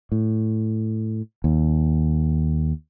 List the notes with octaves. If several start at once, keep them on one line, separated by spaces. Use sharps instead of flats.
A2
D#2